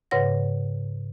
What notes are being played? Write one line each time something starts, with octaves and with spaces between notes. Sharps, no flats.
G#2 C#3 B4 C#5 F#5 A#6